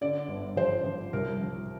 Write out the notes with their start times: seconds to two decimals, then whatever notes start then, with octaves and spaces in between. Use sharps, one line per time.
0.01 D3 D5
0.28 G1
0.56 F3 C5
0.84 F3
1.13 C2 A#4
1.40 F3